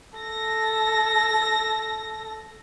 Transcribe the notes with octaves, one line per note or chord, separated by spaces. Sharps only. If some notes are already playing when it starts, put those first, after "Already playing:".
A4 A#6